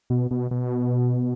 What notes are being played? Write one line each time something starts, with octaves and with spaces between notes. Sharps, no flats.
B2
B2
B2